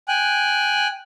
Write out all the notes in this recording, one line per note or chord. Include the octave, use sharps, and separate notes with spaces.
G5 G#5 F#6